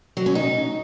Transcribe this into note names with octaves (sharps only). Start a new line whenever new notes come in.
F#3
C#4
D#4